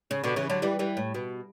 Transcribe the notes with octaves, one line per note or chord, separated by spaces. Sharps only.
C#3
B2 D3
C#3 E3
D3 F#3
E3 G3
E3 G3
A2
B2